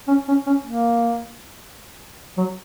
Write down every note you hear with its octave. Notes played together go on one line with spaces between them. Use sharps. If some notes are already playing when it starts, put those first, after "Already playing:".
C#4
C#4
C#4
A#3
F#3